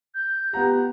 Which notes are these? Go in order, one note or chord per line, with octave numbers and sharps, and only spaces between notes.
G6
B3 F4 G4 F#5 A#5